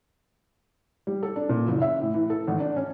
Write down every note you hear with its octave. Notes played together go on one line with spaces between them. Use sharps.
G3
A4
D4
A#2
F#1
E5
A2
E3
A4
G#1
D4
C#4